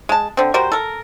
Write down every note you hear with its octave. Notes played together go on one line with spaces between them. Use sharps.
G#3 A5
D3 C4
G3 F#4 A#4 C5
A4 A#4